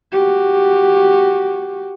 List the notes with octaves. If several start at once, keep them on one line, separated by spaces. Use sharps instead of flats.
F#4 G4